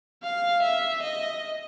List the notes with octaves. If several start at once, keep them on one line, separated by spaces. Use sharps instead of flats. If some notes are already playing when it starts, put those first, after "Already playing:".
F5
E5
D#5